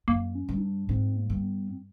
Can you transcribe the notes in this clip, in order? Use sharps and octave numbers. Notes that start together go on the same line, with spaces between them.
F#2 A#3
C#4
G2
D#4
D4
G#2 C4
A#3
G2
B3
C4